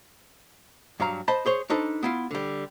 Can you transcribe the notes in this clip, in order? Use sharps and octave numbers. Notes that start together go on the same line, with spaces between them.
G2 F#3 F5 A#5
C5 D#5 A5 B5
G#4 C5 C#5
D4 D#4 A4 B4 C5
B3 E4 F4
D3 G3